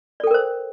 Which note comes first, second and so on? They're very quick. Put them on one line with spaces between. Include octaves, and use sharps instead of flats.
D5 A4 G5 A#4 C5